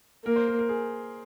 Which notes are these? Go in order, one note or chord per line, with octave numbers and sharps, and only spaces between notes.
A#3 A#4
C5
A#4
A#4
G#4